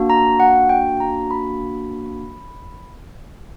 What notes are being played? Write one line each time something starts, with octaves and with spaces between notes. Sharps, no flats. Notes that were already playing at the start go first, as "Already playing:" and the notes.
Already playing: A#3 D4 F#4
A#5
F#5
G5
A#5
B5